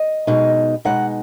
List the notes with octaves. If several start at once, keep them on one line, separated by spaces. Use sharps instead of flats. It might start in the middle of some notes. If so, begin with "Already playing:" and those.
Already playing: D#5
B2 G#3 D#4
B2 G#3 D#4 F#5